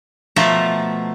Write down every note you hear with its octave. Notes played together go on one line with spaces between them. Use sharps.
B2 F3 A3 E5 A5 A#5